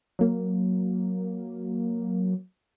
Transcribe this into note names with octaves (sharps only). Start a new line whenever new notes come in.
F#3 A#3